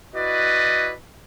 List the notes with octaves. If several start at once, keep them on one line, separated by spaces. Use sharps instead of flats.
E4 F#4 B4 D5 D#5